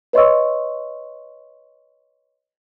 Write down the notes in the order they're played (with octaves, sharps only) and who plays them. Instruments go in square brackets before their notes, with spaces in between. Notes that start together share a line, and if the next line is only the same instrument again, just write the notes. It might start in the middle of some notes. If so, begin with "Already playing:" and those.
[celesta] B4 C#5 D#5 C6 C#6 E6